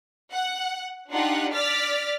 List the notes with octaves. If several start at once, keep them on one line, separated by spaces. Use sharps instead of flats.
F#5
D4 D#4 F4 G4 F#5
D5 F6 A6 B6